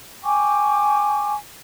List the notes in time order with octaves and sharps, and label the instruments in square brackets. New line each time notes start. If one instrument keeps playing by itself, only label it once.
[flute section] G5 G#5 C#6 D6